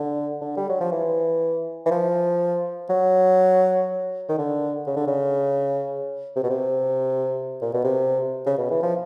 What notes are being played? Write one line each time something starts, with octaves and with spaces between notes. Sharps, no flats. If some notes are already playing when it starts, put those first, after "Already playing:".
Already playing: D3
D3
G3
F#3
F3
E3
E3
F3
F#3
D#3
D3
C#3
D3
C#3
C3
B2
C3
A#2
B2
C3
C#3
B2
E3
F3